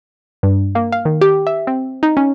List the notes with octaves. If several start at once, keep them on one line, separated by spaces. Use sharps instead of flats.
G2
A#3
F5
D#3
G4
E5
C4
D#4
C#4